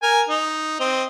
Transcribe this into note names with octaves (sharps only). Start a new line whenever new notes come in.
A#4 G#5
D#4
C4 D#5